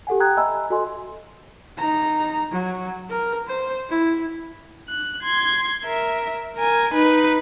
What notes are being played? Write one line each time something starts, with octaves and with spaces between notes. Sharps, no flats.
G4 A4 F#5 G#5
G5 A#5 D#6 F#6 G#6
D#5 E5 G#5 A#5 B5 E6
F#4 A4 D#5 G#5 C6
D#4 A#5
F#3
A#4
C5
E4
F#6
C6 G#6
A#4 E5
A#4 G#5
D#4 B4